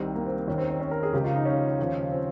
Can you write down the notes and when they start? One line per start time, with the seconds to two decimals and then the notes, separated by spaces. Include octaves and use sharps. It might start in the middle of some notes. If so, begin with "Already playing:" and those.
Already playing: C2 C3 D#3 C4
0.15 A#3
0.26 C4
0.48 D#2 D#3 C#4
0.58 C4
0.70 C4
0.80 C#4
0.91 A#4
1.03 G#4
1.13 C#2 C#3 F3 G4
1.24 F4
1.35 D#4
1.45 C#4
1.79 D#2 C#3 F3
2.12 C4